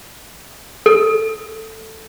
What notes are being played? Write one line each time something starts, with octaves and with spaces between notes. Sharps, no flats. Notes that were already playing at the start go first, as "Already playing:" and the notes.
A4